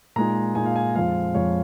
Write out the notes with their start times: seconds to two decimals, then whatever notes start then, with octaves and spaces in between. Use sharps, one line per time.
0.16 A#2 G#3 D#4 A#5
0.55 A#2 G#3 D#4 G#5
0.66 F5
0.76 G#5
0.95 F2 F3 G#3 F5
1.35 F2 F3 G#3 C#5